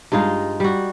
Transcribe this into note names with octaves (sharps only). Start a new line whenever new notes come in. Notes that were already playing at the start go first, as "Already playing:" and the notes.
G2 G#3 D#4 F4
G3 F#4